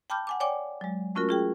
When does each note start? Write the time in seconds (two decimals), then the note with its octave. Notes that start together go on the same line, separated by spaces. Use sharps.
0.10 G5 A5 B5 D6 F6 G6
0.27 F#5 G#5 D6
0.40 C#5 D5 G5 G#5 D6
0.81 F#3 G#3
1.15 A3 C#4 F4 F#4 A#4
1.29 F4 G#4 G5